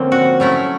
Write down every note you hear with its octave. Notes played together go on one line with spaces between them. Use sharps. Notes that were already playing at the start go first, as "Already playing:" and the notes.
Already playing: D3 F3 A#3 C4 C#4
F#4
F#3 A3 C#4 E4